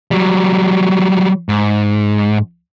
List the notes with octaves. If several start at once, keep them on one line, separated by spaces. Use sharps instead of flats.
F#3 G3
G#2